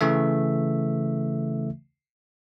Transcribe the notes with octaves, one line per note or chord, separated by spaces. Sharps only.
C#3 E3 A3 E5